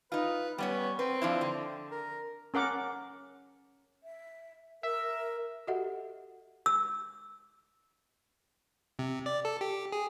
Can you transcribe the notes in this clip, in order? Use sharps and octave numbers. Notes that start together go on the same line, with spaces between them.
D#4 F4 B4
G3 B3 C#4 C#5
C4 B4
F3 D4 E4
D3
A#4
C#4 A#4 F#5 D6
E5
A#4 E5
F#4 G4 A4 D#5 E5 F#5
E6
C3
D5
A4
G4
G#4